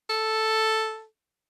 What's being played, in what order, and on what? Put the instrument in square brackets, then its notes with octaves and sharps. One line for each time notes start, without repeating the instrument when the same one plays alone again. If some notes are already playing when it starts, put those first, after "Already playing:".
[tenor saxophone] A4